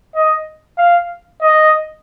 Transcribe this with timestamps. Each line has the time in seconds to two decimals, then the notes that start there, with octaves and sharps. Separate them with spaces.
0.15 D#5
0.78 F5
1.41 D#5